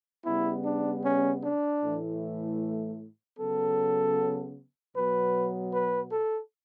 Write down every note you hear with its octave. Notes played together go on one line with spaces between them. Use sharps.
C#3 G3 B3 E4
D4
C#4
D4
A2 E3 A3
C#3 F#3 B3 A4
B2 F#3 B3 B4
B4
A4